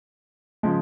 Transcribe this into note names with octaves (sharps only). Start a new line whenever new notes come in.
C#3 F3 G#3